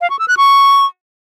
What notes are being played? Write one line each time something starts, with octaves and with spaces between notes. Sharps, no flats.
F5
C#6
E6
F#6
C#6